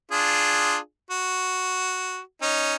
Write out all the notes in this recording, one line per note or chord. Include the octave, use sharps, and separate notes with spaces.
D4 F4 G#4
F#4
C#4 D#4